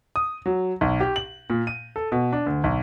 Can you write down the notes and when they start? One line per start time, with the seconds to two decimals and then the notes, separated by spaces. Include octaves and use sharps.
0.16 D#6
0.46 F#3
0.81 B1
1.00 G4
1.16 F#7
1.50 A#2
1.67 D#7
1.96 A4
2.12 B2
2.33 D4
2.46 D2
2.64 B1